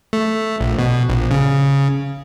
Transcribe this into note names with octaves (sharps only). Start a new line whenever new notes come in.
A3
A#1
B2
A#1
C#3